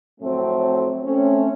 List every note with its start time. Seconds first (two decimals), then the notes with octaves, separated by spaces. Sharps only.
0.20 F2 A2 F#3 A3 C4
1.04 A3 C4 C#4